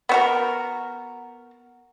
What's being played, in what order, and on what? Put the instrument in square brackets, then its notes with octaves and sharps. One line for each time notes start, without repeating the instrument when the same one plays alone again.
[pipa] B3 F#4 A#4